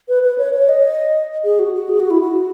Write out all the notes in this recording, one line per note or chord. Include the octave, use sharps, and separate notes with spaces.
B4
B4
C#5
C#5
D#5
G#4
F#4
F#4
G#4
F#4
E4
F#4